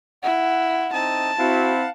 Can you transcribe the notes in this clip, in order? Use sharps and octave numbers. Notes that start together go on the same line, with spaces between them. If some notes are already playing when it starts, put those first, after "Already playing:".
E4 F#5
C4 D#4 A5 D#6
C4 E4 F#4 F5 F#5